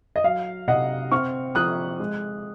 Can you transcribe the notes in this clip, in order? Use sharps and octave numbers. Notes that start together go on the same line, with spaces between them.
D#5
F#3 F5
C3 D#5 F#5
C4 C#6 F6
F3 D#6 F#6
G#3